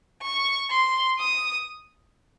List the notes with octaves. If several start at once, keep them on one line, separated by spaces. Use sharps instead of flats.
C#6
C6
D#6